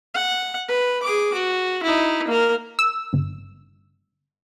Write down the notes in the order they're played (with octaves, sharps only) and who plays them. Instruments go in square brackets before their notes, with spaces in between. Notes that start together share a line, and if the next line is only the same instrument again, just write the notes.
[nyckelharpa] F#5
B4
G#4 D6
F#4
D#4 E4
A#3 A#4
[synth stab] E6
G1